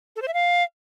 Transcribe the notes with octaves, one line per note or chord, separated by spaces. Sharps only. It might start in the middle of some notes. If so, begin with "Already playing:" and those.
A4
C5
E5
F5